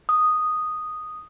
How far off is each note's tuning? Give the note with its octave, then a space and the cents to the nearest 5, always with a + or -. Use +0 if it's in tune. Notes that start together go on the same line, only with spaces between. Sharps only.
D#6 -5